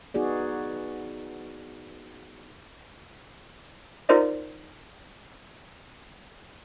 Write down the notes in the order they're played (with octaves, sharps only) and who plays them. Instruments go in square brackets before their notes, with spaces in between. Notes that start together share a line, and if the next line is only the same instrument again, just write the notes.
[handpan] B3 D#4 F#4 G#4 D5
[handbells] D#4 F4 A#4 C5 D5 D#5